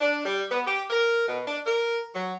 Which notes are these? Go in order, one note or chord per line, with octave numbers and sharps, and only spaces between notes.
D4
G3
B3
G4
A#4
B2
D4
A#4
F#3